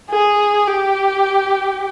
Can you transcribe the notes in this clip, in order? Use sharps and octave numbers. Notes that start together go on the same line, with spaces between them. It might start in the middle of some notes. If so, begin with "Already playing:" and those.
G#4
G4